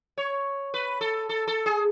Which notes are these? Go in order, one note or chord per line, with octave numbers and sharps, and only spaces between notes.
C#5
B4
A4
A4
A4
G#4